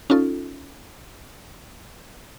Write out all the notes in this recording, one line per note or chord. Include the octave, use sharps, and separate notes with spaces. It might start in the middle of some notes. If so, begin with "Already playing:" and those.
C#4 D#4 F4 A4